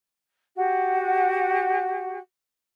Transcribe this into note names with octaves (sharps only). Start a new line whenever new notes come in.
F#4 G4 F#5